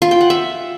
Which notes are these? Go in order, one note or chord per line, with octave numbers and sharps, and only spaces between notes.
F4
G5
F#5
E5